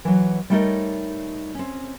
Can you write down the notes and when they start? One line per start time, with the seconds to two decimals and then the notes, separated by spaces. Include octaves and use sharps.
0.05 E3 F#3
0.50 G3 A3 D#4 A#4 C#5 D#5
1.55 C4 C#4